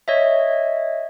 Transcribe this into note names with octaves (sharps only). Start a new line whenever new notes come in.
C#5 D#5 E5